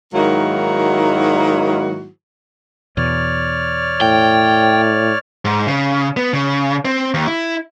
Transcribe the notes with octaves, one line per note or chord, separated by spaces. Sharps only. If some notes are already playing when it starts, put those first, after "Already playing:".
G#2 D#3 F#3 A#3 E4 F#4
E2 B2 C#5 D5 F6
A2 G5
G#2
C#3
B3
C#3
C4
D#2
E4